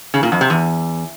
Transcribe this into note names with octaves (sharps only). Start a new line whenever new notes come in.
C#3
A#2
F2
C3
E2